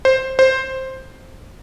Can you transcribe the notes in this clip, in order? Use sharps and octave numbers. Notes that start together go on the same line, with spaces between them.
C5
C5